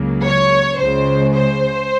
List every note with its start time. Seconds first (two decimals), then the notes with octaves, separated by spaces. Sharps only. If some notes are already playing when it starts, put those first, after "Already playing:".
Already playing: C#2 C#3 F#3 A#3
0.25 C#5
0.79 C#2 C#3 G#3 C5
1.35 C5